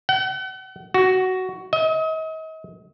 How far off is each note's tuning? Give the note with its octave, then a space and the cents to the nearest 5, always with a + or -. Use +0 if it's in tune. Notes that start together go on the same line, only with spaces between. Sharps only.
F#5 +40
F#4 +10
D#5 +40